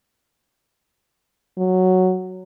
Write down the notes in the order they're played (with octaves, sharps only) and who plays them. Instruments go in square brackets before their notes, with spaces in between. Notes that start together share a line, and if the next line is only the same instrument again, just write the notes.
[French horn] F#3